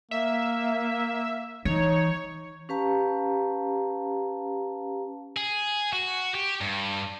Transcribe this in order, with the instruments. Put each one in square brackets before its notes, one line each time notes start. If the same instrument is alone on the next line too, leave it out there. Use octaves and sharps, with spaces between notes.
[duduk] A#3 [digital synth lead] E5
[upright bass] E3 [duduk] D#4 [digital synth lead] C#5
[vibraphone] C#4 G4 B4 F5 A5 A#5
[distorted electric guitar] G#4
F#4
G4
G2